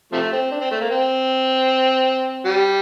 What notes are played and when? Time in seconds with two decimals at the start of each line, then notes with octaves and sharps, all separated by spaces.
0.12 C3 F3 A3
0.32 C4
0.51 D4
0.61 C4
0.71 A3
0.80 A#3
0.90 C4
2.45 G3